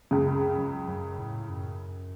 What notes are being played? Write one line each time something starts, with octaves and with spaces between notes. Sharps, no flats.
C#2 F#2 C#3
F#3
F#2
A2
F#2